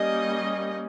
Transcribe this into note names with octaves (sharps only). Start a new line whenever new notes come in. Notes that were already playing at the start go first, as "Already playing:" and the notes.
Already playing: G3 A#3 C#4 D#5